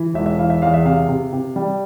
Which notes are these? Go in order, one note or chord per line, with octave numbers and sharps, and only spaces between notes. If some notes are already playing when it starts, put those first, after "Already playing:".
Already playing: E3
E1 E5
E5
E3 F5
E5
E2 F5
E5
C3 F5
C3
C3
G3